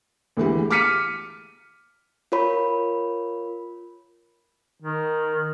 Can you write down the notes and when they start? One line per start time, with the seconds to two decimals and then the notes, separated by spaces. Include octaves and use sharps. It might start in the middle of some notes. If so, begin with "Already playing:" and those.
0.37 D2 E3 G#3 G4
0.70 D6 F6 B6 C#7 D#7
2.32 F4 A#4 C#5 B5
4.81 D#3